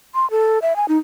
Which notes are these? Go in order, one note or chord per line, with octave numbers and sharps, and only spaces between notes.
C6
A4
E5
G#5
D#4